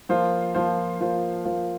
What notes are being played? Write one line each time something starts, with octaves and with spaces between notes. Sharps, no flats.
F3 A#3 F4 C5
F3 A#3 F4 C5
F3 A#3 F4 C5
F3 A#3 F4 C5